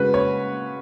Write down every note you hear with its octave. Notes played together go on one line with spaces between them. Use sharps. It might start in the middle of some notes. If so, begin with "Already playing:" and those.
Already playing: C#3 G#3 F#4 B4
C#5